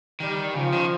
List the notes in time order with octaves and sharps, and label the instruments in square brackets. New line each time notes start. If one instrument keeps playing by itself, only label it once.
[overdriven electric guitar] D#3 [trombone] G3
[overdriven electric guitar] C#3 [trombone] F3
[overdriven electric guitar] D#3